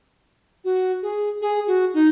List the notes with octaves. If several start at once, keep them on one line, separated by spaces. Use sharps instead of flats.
F#4
G#4
G#4
F#4
D#4